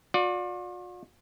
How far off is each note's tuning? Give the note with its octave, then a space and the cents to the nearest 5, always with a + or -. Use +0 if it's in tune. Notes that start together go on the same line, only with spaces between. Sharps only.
F4 +45 D5 +0